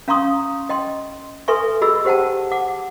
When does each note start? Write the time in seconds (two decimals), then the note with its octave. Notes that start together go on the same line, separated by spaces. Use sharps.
0.08 C#4 F5 A#5 C6 C#6 D#6
0.69 D#5 G5 C6
1.48 A4 B4 E5 G#5 C6 C#6
1.81 F#4 G#4 D#5 B5 E6
2.05 G4 C5 F#5 G5 A5
2.51 F#5 D6